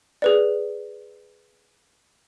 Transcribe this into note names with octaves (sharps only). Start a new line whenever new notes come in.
G#4 B4 D5